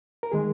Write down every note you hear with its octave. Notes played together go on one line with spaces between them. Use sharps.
A#4
D#3 G#3 G#4